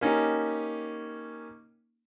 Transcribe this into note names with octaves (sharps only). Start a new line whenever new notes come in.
A#3 C#4 D#4 G4